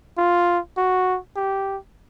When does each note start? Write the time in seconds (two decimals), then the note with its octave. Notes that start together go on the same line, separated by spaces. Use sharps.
0.18 F4
0.77 F#4
1.36 G4